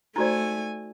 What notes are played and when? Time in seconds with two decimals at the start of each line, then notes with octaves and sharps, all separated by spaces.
0.16 A3 D#4 F#4 C5 D5 G#5 A#5